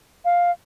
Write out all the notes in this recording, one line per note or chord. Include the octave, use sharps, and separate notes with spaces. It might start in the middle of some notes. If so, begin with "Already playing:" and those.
F5